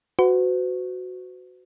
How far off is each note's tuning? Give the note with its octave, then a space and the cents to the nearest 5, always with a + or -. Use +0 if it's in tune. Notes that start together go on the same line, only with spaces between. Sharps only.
F#4 +0 B4 +45